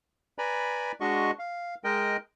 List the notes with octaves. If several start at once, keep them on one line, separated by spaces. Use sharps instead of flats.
B4 D5 G#5 A#5 B5
G#3 D4 F#4 D#5 C#6
F5
G#3 A#4 D#5 G5